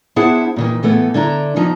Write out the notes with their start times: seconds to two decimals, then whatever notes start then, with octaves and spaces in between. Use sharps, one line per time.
0.16 B3 D4 E4 G#4 C5 F#5
0.56 A#2 D#3 E3
0.83 A2 E3 A3 B3
1.14 D3 D4 E4 A#5
1.56 E2 F3 D#4 A#5